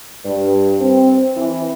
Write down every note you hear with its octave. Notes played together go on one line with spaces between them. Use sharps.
G2
C4
E3